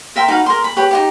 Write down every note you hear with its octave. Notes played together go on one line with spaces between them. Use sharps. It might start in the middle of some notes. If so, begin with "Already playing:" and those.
A#4 E5 G5 C6
D#4 F#4 B4 F5
A#4 C6
B5
G4 B4 C#5
D#4 E4 G4